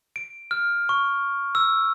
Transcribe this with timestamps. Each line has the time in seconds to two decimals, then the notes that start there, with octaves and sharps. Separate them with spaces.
0.16 D7
0.51 F6
0.89 C#6
1.55 E6